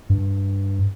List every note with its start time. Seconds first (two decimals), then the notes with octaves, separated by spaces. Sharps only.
0.10 G2